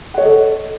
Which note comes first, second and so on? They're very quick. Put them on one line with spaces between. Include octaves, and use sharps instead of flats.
F#5 C#5 D#5 A4